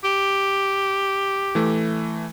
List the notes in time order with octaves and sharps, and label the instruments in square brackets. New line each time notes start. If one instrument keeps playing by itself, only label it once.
[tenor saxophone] G4
[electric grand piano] E3 A3